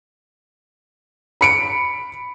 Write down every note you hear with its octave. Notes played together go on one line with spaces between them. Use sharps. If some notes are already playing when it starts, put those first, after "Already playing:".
B5 C#7 D7